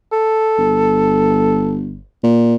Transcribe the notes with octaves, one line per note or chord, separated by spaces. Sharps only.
A4
G1
A#2